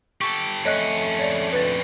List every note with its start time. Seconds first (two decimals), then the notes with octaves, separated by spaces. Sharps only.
0.21 G4 A4 C#6
0.65 F2 A3 C#4 C#5 D#5 F#6
1.19 C#5 D5
1.53 D2 B4 A6